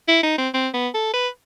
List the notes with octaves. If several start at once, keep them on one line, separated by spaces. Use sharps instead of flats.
E4
D#4
C4
C4
B3
A4
B4